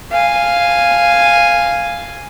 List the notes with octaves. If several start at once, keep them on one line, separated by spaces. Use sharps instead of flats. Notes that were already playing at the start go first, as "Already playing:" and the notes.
F5 G#5